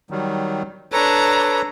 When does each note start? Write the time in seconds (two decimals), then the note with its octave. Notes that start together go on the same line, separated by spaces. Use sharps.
0.11 D#3 F#3 G3
0.92 D4 A4 B4 C#5 A#5